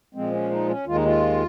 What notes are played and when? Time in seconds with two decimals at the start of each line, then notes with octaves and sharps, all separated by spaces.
0.15 A#2 F3 G#3 C4
0.33 C#4
0.51 D#4
0.69 C#4
0.86 D#2 D#3 G#3 F4
0.95 D#4
1.06 F4